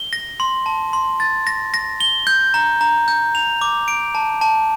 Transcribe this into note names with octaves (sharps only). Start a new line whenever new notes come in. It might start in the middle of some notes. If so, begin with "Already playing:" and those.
Already playing: G7
A#6
C6
A5
C6
A6
A#6
A#6
G7
G6
A#5
A#5
G6
F7
D6
D7
A5
A5